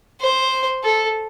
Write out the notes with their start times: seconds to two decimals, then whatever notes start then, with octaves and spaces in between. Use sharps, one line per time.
0.21 C5
0.84 A4